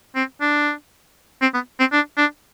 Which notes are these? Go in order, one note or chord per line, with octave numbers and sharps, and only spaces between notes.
C4
D4
C4
B3
C4
D4
D4